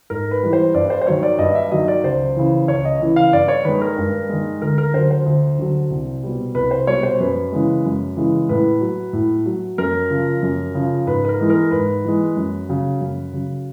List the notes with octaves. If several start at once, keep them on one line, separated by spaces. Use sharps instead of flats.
G#2 A#4
B4
E3 G3
C5
G2 D5
C5
C5
D#3 F#3 C#5
D5
G2 D#5
E5
D#3 F#3 D#5
D5
C#2 C5
C#3 E3
C#2 C#5
D#5
C#3 E3
F5
G2 D5
C#5
D#3 G#3 B4
A#4
G2
D#3 G#3
D2 A#4
A#4
D3 F#3 C5
C5
D2
D3 F#3
C2
B2 G3
C2 B4
C5
B2 G3 C#5
C5
F#2 B4
C#3 E3 G#3
F#2
C#3 E3 G#3
A2 B4
F#3
A2
F#3
F#2 A#4
C#3 F3
F#2
C#3 F3
G#2 B4
B4
A#4
E3 G#3
A#4
G#2 B4
E3 G#3
F#2
C#3 F#3
F#2
C#3 F#3